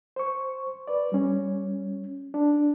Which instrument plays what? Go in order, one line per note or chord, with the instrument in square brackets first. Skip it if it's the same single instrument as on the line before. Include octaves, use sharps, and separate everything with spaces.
[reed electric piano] C5 C#6
B4 D5
G3 C#4
D4